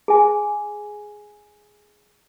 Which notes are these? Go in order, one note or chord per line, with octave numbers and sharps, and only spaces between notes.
G#4 G#5